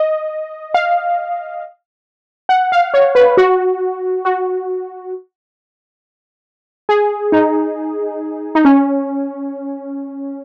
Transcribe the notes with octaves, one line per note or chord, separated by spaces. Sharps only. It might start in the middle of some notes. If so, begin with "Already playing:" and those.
Already playing: D#5
F5
F#5
F5
C#5
B4
F#4
F#4
G#4
D#4
D#4
C#4